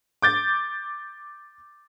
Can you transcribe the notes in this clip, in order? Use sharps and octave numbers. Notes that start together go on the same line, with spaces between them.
D6 G6 A6